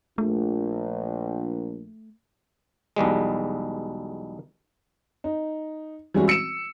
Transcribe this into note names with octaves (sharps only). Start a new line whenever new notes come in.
A#1 A3
B1 E2 G3 G#3
D#4
E3 G3 G#3 C#4 E4 F#4
E6 C#7 D7 E7